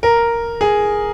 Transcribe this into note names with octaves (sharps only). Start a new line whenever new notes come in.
A#4
G#4